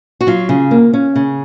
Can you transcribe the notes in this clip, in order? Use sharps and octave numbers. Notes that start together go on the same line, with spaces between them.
F#4
F#3 F4
C#3
A#3
C#4
C#3